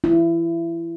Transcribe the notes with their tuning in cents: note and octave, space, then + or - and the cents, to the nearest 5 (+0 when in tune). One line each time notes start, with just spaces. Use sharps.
E4 +25